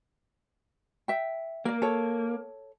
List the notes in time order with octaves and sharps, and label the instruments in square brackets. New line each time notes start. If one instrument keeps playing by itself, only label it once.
[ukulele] E5 G5
[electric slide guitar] A#3 [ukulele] A#4 D5
[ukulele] A4 C#5